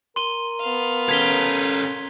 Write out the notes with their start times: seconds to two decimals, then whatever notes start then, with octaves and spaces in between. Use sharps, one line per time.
0.16 A#4 C6 D#7 G7
0.60 B3 F5
1.09 C#4 A4 G#6 B6 G7